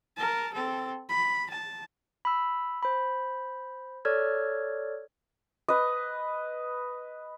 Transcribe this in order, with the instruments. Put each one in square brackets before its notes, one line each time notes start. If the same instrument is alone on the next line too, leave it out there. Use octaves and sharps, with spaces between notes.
[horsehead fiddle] A#4 A5
C4 A4
B5
A5
[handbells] B5 E6
C5 B5
A4 C#5 D5 F6 G#6
[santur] B4 D#5